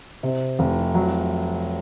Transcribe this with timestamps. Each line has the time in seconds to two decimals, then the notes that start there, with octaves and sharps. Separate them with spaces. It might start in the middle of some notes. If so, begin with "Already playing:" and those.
0.23 C3
0.59 F1
0.95 F#3